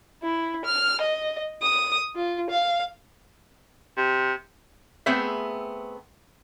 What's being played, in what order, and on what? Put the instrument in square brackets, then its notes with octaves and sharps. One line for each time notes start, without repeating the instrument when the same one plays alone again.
[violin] E4
F6
D#5
D#6
F4
F5
[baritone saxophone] C3
[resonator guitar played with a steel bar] A3 B3 C4 G#4 E5